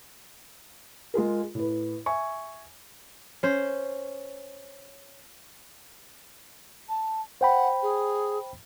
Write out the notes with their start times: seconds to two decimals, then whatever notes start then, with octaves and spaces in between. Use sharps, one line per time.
1.14 G#3 F4 G#4 A#4
1.55 A2 B4
2.06 E5 G#5 C#6
3.43 C#4 C5
6.89 A5
7.41 C5 F#5 G5 B5
7.82 G#4